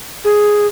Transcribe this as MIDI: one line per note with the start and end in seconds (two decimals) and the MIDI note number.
0.25 0.67 68